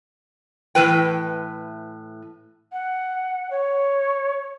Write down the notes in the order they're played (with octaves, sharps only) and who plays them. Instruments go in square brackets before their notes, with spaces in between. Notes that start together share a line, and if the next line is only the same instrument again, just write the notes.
[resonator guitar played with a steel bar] A2 E3 B4 G5
[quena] F#5
C#5